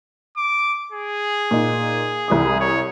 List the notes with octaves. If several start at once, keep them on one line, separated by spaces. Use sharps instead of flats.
D6
G#4
A#2 D#4
C2 E4 D#6
C#5